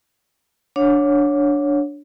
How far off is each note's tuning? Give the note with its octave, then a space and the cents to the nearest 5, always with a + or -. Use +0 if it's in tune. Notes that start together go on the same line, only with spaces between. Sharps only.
D4 -5 C#5 +0 F#5 -35